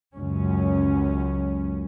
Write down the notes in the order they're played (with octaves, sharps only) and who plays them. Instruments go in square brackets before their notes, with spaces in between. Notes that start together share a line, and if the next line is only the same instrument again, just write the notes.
[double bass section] C#2 F#2 C#4